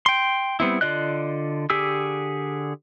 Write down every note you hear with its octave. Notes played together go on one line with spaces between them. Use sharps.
G5 C6
G3 B3 C4 E4
D3 F4 D5 D#5 F#6
D3 G4 G#4 E6